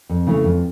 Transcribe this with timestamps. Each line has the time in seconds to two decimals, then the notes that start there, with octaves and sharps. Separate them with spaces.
0.10 F2
0.27 C#3 E3 A3
0.44 F2